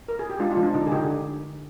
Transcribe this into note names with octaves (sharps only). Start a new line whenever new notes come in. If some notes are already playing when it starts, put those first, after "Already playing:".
A#4
G#4
G4
G#3 D4 F4
D4 F4
F3
D4
D3 D#4
G#4
D3 D#4 G4